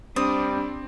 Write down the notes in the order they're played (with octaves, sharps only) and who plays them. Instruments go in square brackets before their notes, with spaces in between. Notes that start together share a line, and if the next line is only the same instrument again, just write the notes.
[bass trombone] G3 [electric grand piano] C4 [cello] D4 [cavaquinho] D#6